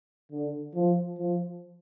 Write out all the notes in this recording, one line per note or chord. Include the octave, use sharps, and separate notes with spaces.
D3
F3
F3